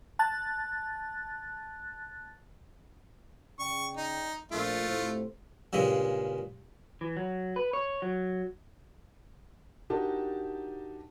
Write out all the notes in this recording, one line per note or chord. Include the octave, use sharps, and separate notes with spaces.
A5 F#6 A6
C#3 D5 G5 C#6
D#4
A#1 A3 F4
A2 C3 C5
G2 A#2 C#3 G#3
E3
F#3
B4
C#5
F#3
D4 D#4 F#4 G4 A#4 A5